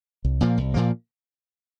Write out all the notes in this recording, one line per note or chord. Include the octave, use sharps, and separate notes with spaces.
C2
A#2 F3 A#3
C2
A#2 F3 A#3